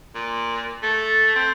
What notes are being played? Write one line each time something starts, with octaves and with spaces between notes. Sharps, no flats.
A#2
A3
C4